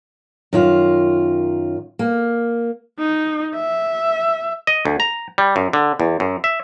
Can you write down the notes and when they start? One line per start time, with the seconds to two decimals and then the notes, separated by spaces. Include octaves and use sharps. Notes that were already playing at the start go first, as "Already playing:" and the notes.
0.53 F#2 D#3 F4
1.99 A#3
2.99 D#4
3.55 E5
4.67 D#5
4.85 D2
5.00 A#5
5.38 G3
5.56 F#2
5.73 D3
6.00 E2
6.20 F#2
6.44 E5